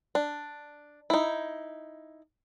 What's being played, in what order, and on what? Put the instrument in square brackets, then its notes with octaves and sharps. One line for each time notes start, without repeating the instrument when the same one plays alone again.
[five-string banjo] D4
D#4 E4